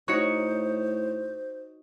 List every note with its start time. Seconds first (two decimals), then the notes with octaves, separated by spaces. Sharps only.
0.08 A2 D#4 F#4 C5 C#5 C#6 C#7